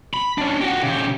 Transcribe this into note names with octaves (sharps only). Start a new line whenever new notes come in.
B5
C#4 D4
F#4 G4
C#3 G4